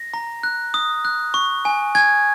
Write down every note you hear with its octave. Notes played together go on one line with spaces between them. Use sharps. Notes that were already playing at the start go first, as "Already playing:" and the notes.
Already playing: A#6
A#5
F#6
D#6
F#6
C#6
G#5
G#5 G#6